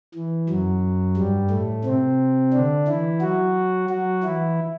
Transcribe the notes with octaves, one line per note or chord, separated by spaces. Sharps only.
E3
F#2 F#3
G2 G3
A2 A3
C3 C4
D3 D4
E3 E4
F#3 F#4
F#3 F#4
E3 E4